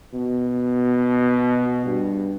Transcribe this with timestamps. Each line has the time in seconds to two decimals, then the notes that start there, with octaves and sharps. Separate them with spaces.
0.14 B2
1.86 G2